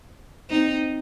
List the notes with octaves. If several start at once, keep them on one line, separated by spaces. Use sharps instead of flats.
C4 D#4